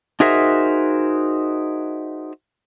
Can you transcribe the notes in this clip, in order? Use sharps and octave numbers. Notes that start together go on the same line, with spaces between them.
D#4 F#4 G#4 A#4 C5 E5